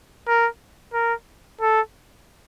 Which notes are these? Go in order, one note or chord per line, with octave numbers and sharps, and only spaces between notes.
A#4
A#4
A4